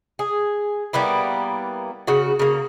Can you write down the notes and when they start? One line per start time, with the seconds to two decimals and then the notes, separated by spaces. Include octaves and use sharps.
0.19 G#4
0.93 G3 A#3 B3 E4
2.07 C#3 F#4
2.39 C#3 A#3